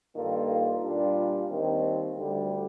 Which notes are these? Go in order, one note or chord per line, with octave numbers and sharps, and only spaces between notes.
G2 D#3 A#3 F4 A4
A#2 G3 D4 F4
D#2 D#3 G3 C4
D2 D3 G3